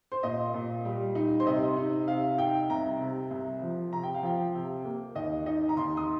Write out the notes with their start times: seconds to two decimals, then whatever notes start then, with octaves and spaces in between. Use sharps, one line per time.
0.12 C5
0.23 A#2 D#5
0.54 A#2
0.85 G3
1.15 D#4
1.40 C5
1.46 C3 D#5
1.77 D#4
2.08 C3 F5
2.38 D#4 G5
2.70 C2 A#5
3.00 C3
3.31 C2
3.62 F3
3.92 C3 A#5
4.03 G5
4.14 F5
4.23 F3 G5
4.55 C3
4.85 A#3
5.15 D#2 D#5
5.46 D#4 D#5
5.69 A#5
5.77 D#2 C6
5.97 D#6